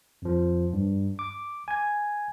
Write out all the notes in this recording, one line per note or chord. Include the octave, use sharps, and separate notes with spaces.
F2 F3
G2
D6
G#5 G#6